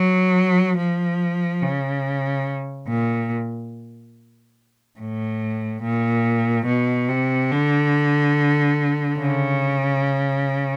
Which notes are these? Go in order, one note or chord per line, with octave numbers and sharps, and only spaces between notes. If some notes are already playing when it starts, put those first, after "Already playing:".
Already playing: F#3
F3
C#3
A#2
A2
A#2
B2
C3
D3
C#3